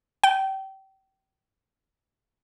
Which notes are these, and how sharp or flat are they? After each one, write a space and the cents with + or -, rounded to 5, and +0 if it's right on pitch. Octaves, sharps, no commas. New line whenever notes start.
G5 -30